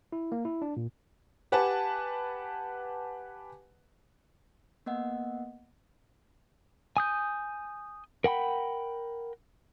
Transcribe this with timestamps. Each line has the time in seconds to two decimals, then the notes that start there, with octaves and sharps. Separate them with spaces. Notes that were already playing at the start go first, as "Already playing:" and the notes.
0.12 E4
0.32 A#3
0.45 E4
0.62 D4
0.77 A#2
1.52 G4 B4 F#5 G#5 A5
4.86 A#3 B3 D#5 F#5
6.97 G#5 D#6 G6
8.24 A#4 F#5 G5 B5